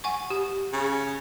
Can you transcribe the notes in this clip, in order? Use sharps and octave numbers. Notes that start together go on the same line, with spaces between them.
F#5 G#5 C#6
G4
C#3